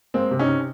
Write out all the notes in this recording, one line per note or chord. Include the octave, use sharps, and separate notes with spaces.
G#3 A#3 C4
C3
C#4 D#4
C3